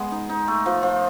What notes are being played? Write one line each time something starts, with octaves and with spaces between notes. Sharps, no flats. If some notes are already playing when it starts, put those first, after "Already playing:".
Already playing: G#3 B3
D#4
D#4
A3
F3
F3